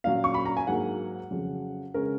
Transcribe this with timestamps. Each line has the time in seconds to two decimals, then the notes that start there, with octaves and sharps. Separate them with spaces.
0.04 A#2 F#3 C#4 F5
0.24 C#6
0.34 B5
0.45 A#5
0.57 G#5
0.67 G#2 F#3 A#3 F#5
1.31 F2 C#3 F#3
1.94 C#3 G#3 C#4 A#4